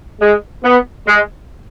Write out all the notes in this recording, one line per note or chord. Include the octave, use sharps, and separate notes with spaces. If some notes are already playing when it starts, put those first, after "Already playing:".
G#3
B3
G#3